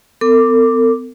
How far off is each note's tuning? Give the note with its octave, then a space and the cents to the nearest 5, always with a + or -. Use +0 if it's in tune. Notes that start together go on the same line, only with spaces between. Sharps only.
B3 +45 A4 +45 D6 +0